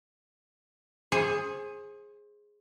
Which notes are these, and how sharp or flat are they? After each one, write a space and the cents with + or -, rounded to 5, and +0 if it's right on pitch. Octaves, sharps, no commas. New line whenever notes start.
G#4 +0 C5 +30